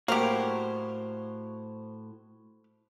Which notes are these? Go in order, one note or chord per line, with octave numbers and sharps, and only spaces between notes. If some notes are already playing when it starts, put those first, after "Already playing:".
A2 A#3 F#4 G4 C5 F5